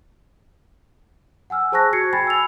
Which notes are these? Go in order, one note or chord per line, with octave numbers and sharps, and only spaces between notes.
F#5 G#5 E6 F6
G#4 C5 A5 C#6 F#6 A#6
F#4 G#6 C7 C#7
G5 G#5 B5 G#6 A6
E6 F7